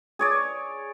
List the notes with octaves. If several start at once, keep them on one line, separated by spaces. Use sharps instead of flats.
G#4 C#5 D5